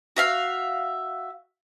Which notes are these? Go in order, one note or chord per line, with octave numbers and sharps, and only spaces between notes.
F#4 E5 F5